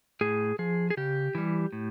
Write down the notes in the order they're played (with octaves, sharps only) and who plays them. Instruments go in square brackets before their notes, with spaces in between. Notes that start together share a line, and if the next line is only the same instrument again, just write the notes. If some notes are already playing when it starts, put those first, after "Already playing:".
[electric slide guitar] A2 G#4
F3 G#4
G#4
C#3 G4
E3 G3
A2